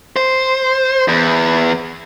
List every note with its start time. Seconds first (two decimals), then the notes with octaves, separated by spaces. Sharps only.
0.16 C5
1.08 E2